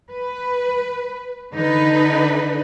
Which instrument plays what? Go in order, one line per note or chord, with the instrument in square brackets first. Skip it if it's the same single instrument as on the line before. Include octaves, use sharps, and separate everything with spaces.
[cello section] B4
D3 D#4 B4